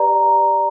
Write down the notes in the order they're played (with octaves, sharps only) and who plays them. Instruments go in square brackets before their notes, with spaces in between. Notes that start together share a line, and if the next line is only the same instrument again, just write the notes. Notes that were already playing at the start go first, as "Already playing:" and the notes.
Already playing: [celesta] G4 B4 D5 A#5